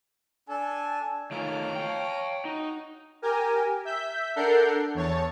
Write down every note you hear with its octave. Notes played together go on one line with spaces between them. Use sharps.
D4 A4 G#5
D#3 A3 F4 C#5 A#5 D6 F6
F5 G5
D#4 F#4
G4 A#4 G#5
E5 G6 B6
D4 A4 A#4 F#5 G6 C7
E2 C#5 A5